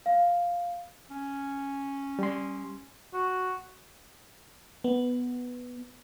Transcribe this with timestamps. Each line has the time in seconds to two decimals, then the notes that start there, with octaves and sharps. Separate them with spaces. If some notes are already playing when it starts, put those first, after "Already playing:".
0.06 F5
1.11 C#4
2.19 G3 C6
3.13 F#4
4.84 B3